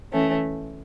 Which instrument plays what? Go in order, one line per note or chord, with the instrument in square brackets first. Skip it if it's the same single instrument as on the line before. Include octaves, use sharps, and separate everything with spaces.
[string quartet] E3 A3 C#4